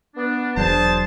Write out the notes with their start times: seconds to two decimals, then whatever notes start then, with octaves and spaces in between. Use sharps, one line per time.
0.16 B3 D4
0.57 E1 F#3 D4 G#4 C5 A5